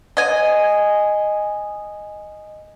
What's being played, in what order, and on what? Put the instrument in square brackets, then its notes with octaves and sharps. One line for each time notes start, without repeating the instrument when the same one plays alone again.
[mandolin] D#5 G#5